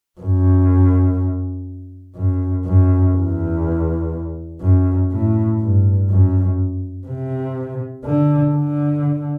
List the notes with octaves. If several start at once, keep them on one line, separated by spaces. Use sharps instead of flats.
F#2
F#2
F#2
E2
F#2
A2
G2
F#2
C3
D3
D3